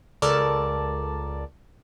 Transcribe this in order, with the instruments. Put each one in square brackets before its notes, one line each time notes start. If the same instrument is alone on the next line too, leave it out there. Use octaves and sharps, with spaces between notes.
[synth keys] C#2 A4 A#4 D5 A5